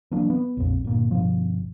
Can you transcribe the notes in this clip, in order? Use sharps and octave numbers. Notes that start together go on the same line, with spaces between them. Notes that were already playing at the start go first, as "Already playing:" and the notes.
E3 F#3 A#3 D4
B3
A#1 F2
G1 A#2
G1 B2 F3